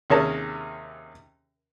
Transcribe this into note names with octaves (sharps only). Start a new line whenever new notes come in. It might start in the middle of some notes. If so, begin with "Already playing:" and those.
D#2 C3 C#4 G#4 A#4 A5